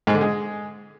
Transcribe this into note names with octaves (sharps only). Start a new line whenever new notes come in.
G#2
D3
G#3